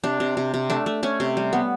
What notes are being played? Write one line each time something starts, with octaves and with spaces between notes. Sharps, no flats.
C3 D4
C3
C3
C3
A3 D4
A3
A3 C#4
C3
G3
B3